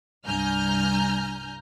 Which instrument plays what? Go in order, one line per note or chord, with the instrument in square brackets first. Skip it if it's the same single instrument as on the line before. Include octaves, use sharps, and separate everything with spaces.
[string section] C2 G2 G#5 A#5 F6 G6